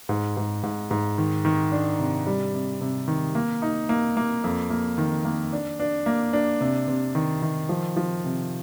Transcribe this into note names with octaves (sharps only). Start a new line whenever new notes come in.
G#2
G#2
G#2
G#2
D#3
D#3
D4
C3
G3
C3
C3
D#3
A#3
D#4
A#3
A#3
F2
A#3
D#3
A#3
D4
D4
A#3
D4
C3
C3
D#3
D#3
F3
F3
C3